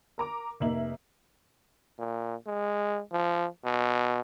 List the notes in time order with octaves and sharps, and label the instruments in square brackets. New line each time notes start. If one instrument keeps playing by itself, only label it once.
[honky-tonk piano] A#4 A#5 D6
F1 A#3 D#4 E5 F#7
[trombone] A#2
G#3
F3
B2